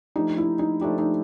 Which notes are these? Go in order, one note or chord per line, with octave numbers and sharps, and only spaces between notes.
F3 A3 D4 D#4 G4
E4
D#4
F3 A3 D4 D#4 G4
D#4